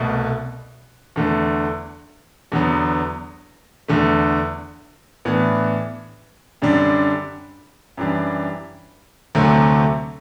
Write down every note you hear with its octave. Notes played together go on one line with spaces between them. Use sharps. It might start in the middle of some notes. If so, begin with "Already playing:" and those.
Already playing: C2 B2 A3
E2 D3 A3
E2 D3 F#3 B3
E2 D3 A3
A2 E3 B3 D4
F#2 D3 G3 D4
F#2 E3 G3 D4
D2 C3 F#3 A3 C4